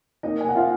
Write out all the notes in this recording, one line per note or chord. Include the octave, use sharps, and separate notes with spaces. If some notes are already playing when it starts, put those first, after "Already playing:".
A#3 D#4 D#5
G#5
A#3 F#5
F4 F5